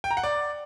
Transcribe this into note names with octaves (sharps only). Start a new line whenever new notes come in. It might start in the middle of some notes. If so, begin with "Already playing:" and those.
G5
A#5
F#5
D5